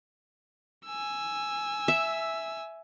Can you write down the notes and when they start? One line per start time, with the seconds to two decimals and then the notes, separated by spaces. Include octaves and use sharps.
0.86 G#5 E6
1.88 E5